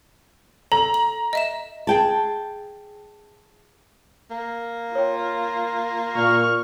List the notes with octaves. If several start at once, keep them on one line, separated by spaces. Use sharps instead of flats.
A4 A#5
F#7
D#5 E5 E7
G#4 G5 A5
A#3
F4 C#5 G5
A#2 C#6 F6